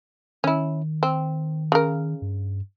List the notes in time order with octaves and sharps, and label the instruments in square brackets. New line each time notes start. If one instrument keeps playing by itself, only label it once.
[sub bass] D#3 [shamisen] C#4 E4
[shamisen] C4
C#3 A#4
[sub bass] G2